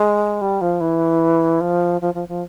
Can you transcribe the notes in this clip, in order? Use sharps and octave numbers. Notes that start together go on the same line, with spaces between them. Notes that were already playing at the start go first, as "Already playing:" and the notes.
Already playing: G#3
G3
F3
E3
F3
F3
F3
F3